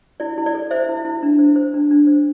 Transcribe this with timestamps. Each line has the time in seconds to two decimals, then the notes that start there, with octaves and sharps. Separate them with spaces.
0.20 E4 D5
0.38 E4
0.46 D5
0.55 A4
0.71 C5 E5
0.89 E4
0.97 E5
1.05 E4
1.23 D4
1.39 C5
1.56 C5
1.74 D4
1.91 D4
2.07 C5